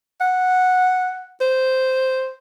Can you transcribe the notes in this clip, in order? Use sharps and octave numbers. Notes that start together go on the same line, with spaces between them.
F#5
C5